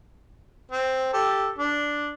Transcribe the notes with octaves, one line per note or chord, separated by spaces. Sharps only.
C4
G4 A4
D4